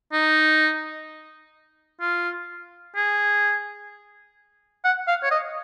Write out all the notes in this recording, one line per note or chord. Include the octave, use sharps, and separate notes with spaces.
D#4
F4
G#4
F#5
F5
C#5
D#5